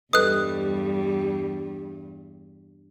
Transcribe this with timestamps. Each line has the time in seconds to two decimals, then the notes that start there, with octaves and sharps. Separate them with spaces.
0.13 E2 G2 G3 A4 B4 D#5 D#6 F#6